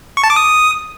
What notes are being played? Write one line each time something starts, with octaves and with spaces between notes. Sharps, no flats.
C#6
A5
D6
D#6